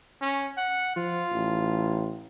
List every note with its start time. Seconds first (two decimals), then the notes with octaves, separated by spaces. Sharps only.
0.21 C#4
0.57 F#5
0.96 F3 F4
1.32 A1